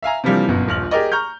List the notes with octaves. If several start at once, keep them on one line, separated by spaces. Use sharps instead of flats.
E5 F5 G#5 A#5
C3 E3 F3 G3 A#3 D4
G1 F#2 B2
D#1 A#1 F6 F#7
G4 G#4 A#4 D5 D#5
A#5 C#6 F6 G6